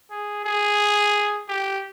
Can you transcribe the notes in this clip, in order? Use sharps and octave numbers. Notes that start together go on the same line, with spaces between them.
G#4
G#4
G4